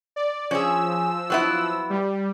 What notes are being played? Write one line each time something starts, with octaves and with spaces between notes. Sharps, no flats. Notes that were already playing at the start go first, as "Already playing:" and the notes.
D5
F3 C#4 G#4 E6
F#3 B3 E4
G3